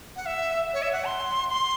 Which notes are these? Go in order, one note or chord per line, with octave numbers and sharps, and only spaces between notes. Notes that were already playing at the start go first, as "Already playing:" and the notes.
F#5
E5
C#5
E5
F#5
C6
C6